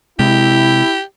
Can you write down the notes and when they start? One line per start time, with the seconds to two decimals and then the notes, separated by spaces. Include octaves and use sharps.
0.19 C3 G#3 E4 G4